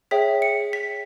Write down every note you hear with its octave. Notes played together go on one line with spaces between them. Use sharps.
G#4 C#5 E5 G5 B6
C#7
B6